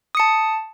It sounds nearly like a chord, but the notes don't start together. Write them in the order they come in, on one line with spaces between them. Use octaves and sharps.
D#6 C#7 A5